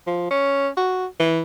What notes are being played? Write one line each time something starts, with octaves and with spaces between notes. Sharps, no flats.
F3
C#4
F#4
E3